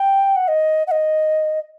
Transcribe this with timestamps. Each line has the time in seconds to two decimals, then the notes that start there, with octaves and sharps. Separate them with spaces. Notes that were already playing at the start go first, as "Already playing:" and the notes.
Already playing: G5
0.36 F#5
0.48 D#5
0.87 F#5
0.91 D#5